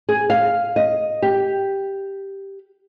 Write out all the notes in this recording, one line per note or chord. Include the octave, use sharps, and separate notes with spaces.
G#4
F5
D#5
G4